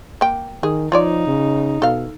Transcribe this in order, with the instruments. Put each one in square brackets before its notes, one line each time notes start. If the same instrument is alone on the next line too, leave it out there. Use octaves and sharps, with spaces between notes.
[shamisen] A#3 G5
[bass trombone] D#3 [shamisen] G#4
[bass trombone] F3 [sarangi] D#4 [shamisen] F4 C#5 D5
[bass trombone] C#3
[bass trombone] B2 [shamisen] A4 F5